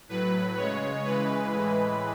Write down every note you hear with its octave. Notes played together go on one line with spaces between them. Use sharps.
A2 F#3 B4
C#3 G#3 C#5
C#3 E3 G#3 B4
A2 E3 G#3